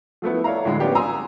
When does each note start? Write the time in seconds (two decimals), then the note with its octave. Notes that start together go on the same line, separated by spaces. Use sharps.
0.22 F3 A3 B3 E4
0.44 A4 C#5 D5 E5 F5 A#5
0.65 A2 D3 G#3
0.80 F3 A#3 B3 C#4 D4 G4
0.95 G#5 A#5 C6 D#6 E6